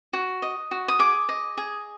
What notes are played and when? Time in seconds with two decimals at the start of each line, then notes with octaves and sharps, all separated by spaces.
0.13 F#4
0.42 D#5
0.71 F#4
0.88 D#6
0.99 G#4 D6
1.29 D#5
1.57 G#4